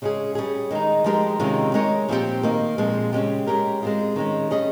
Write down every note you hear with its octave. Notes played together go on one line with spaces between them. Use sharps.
C#3 G#3 C#4 G#4
G3 C#4 G#4
D#3 G#3 D#4
F3 G#3 D#4 G4 A#4
C3 D#3 G#3 C#4 F4
G#3 D#4 A#4 C#5
A#2 F3 C4 G4 C5
D#3 A#3 D#4
A#2 F3 G#3 C4
C#3 G#3 C#4 G4
G#3 C#4 G4 A#4
G#3 C4 F4 G#4
D#3 G#3 C#4
G3 C#4 G#4 D#5